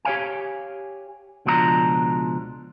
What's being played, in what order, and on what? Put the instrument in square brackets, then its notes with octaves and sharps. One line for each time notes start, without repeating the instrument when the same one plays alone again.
[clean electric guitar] G4 C#5 F5 G#5
C#2 B2 F3 D4 G#4 A#5